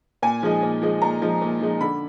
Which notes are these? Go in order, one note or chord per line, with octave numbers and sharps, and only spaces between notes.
A#2 G#5
F3 G#3 D#4
A#2
F3 G#3 D#4
A#2 A#5
F3 G#3 D#4
A#2
F3 G#3 D#4
D3 B5